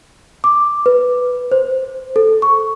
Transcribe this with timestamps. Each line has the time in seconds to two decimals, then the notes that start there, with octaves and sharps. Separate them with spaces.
0.44 D6
0.86 B4
1.52 C5
2.16 A4
2.42 C#6